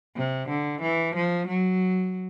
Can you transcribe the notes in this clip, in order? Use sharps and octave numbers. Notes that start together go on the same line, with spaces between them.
C3
D3
E3
F3
F#3